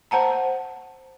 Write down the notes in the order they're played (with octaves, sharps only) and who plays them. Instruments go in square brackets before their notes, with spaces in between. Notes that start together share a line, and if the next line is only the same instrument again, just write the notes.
[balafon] C5 F#5 A5 A#5